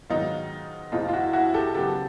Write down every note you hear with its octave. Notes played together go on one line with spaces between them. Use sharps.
G#2 D#3 F#3 B3 D#4 F4
F2 C3 F3 A3 D#4 F4
F4
E4 F#4
E4 F#4
G4 A4
C#3 F#3 B3 G4 A4